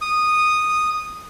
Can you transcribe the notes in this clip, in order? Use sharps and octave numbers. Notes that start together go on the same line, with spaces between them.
D#6